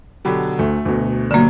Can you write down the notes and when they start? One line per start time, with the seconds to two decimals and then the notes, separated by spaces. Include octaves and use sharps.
0.25 B2 D3 F#3 G4 B5
0.59 D2 A3
0.86 D2 B2
1.31 G2 D3 F#3 A#3